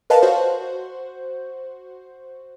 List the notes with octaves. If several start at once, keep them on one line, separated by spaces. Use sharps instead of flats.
A#4 B4 C#5 D#5 F5 A5
F#4 C5